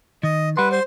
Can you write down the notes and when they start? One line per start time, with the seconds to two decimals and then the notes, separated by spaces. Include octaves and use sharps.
0.23 D#3 D#5
0.57 G3 B4 F#5 C6
0.72 C5